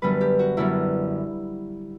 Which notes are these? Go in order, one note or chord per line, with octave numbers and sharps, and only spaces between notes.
F#2 D3 G3 B3 B4
G4
F#4
F#2 D3 G3 B3 E4